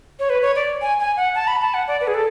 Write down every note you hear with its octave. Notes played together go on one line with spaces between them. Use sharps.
C#5
B4
C#5
D5
G#5
G#5
F#5
A5
B5
A5
F#5
D5
B4
G#4
A4